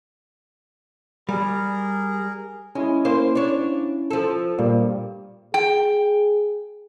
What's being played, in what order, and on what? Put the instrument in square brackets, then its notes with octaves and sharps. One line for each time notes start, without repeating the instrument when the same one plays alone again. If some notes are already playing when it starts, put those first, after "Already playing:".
[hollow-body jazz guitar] G3 [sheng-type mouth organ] G#4 A#4
[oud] G#3 [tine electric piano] C#4 E4
[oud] A#3 C5
D4 C#5
F3 A4
[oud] G2 [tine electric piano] A#2 G3 A#3
[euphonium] G#4 [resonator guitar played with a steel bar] G5